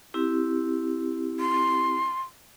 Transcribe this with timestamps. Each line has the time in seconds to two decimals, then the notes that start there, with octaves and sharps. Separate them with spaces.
0.14 C4 E4 G4
1.40 C6